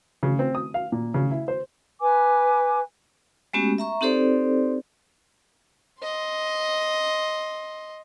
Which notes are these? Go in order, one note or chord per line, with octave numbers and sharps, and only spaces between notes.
C#3
C4
D#6
F5
A#2
C#3
E4
C5
B4 G#5 D6
G#3 A3 B3 C#4 F#4 G4
E5 A#5 C#6
C4 D#4 G4 A4 C5 D5
D#5 C6